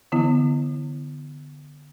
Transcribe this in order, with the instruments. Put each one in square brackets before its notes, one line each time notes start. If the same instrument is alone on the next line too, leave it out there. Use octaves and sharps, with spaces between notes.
[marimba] D3 E3 B3 E4